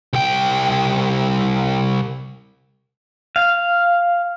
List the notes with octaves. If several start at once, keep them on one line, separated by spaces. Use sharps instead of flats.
C2 G5
F5